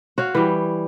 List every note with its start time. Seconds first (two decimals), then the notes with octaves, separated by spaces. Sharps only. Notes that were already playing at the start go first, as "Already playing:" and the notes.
0.18 F#4 C#5 F5
0.35 E3 G3